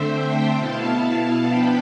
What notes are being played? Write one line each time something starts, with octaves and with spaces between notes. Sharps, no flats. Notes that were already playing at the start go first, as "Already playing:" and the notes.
Already playing: D3 A3 C4 C5 E5
E5 G5
B2 B3 E4 F5 A5
F3 B3 D4 G5 B5